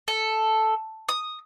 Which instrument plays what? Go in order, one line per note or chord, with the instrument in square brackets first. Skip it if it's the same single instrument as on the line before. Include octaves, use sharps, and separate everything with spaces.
[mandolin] A4
D#6